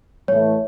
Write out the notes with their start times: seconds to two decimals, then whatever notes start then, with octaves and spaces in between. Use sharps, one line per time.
0.28 A2 E3 A3 C#5